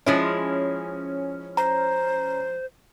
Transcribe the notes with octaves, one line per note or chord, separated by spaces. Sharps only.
F3 G#3 C#4 E4
C5 A#5